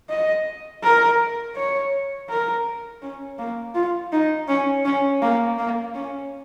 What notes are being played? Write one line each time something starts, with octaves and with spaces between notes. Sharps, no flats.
D#5
A#4
C#5
A#4
C#4
A#3
F4
D#4
C#4
C#4
A#3
A#3
C#4